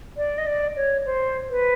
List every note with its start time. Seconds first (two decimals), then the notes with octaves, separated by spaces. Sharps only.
0.17 D5
0.38 D#5
0.47 D5
0.76 C#5
1.06 C5
1.50 B4